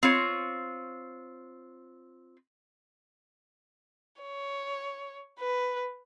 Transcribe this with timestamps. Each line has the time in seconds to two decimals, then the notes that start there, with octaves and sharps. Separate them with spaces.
0.03 C4 F4 C#5
4.22 C#5
5.39 B4